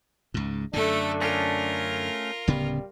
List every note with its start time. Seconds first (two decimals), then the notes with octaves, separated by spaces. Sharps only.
0.34 C#2 G#2
0.73 F#2 D3 A3 D4 A4
1.21 A3 C#4 F4 A#4
2.47 D1 C#3 G3 B3